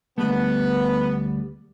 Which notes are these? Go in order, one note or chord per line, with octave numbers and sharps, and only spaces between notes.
D2 G3 A3 B3